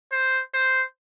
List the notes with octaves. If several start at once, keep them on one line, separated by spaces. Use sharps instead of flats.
C5
C5